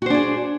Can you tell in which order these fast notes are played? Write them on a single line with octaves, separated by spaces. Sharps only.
F#4 C5 D4 G#4